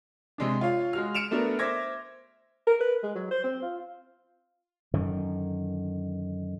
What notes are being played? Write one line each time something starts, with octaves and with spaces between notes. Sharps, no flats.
C3 G#3 D4
F4 C#5 F5
G#3 F#4 F6
F6 C#7 D7 E7 F7
A3 B3 D4 F#4 A#4
C5 E5 D6 G#6 A#6
A#4
B4
G#3
F#3
C5
C4
F4
F#2 D3 D#3